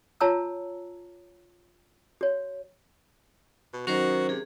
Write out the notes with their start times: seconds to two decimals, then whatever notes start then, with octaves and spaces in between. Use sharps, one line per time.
0.21 F4 C#5 A5 A#5 E6
2.21 F#4 C#5
3.74 B2
3.87 D#3 F#3 C#4 D#4 F#4 A#4 C5
4.29 C3 G#4